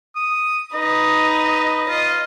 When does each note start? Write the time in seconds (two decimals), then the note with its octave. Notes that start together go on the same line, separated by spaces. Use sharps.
0.16 D#6
0.74 D#4 B4 D#5
1.88 F4 D#5